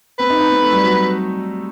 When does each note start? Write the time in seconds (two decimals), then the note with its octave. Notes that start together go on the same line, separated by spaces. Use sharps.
0.18 C4 B4
0.30 D#4
0.40 D#4
0.51 C4
0.62 A3
0.73 G3
0.83 F#3